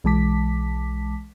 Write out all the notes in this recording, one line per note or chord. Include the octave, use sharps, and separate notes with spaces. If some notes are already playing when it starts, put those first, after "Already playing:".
B1 E3 G#3 A5 D6 B6